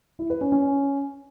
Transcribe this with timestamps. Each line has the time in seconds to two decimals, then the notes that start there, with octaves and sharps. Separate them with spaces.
0.19 E4
0.30 B4
0.41 C#4
0.52 C#4